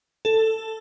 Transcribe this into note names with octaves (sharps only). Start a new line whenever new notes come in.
A4